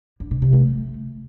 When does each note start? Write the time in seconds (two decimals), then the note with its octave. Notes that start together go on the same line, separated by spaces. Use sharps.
0.20 D3
0.31 B2
0.42 C3
0.53 A3